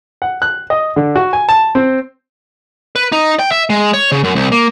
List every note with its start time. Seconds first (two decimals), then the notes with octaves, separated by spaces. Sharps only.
0.22 F#5
0.42 F#6
0.70 D#5
0.96 D3
1.15 F#4
1.33 G#5
1.49 A5
1.75 C4
2.96 B4
3.12 D#4
3.39 G5
3.51 E5
3.70 G#3
3.93 C#5
4.12 C#3
4.24 F#2
4.35 C2
4.52 A#3